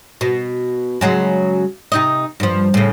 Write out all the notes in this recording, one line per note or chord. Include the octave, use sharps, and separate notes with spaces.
B2
C#3 F#3 G#3
C3 D#4 D#5
G2 F3
A2 C#3